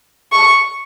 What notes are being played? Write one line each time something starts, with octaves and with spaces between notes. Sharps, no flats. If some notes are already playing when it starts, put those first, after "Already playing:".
C#6